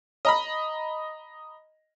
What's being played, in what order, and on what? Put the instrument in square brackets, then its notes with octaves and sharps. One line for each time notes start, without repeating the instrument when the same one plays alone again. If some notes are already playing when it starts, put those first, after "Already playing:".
[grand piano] D#5 A#5 B5